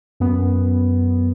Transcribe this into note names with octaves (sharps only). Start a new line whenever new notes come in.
F#2 B3